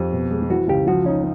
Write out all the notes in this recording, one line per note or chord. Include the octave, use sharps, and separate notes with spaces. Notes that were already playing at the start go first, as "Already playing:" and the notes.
Already playing: F2 G4
B2
G#3
E3 F#4
C#2 G4
F3 F#4
C#4 D#4